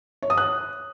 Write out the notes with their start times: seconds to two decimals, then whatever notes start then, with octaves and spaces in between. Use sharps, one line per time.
0.22 C#5
0.30 D#6
0.37 F#6